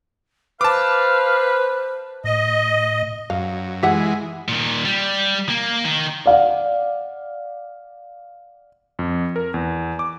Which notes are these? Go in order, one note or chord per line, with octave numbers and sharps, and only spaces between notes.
B4 C5 F5 A5 D6
A2 D#5
F#2 F5
E3 G#3 G4 E5 F#5
A#2 D#3
G3
A#3
D#3
D5 F5 F#5
F2
A#4
E2
D6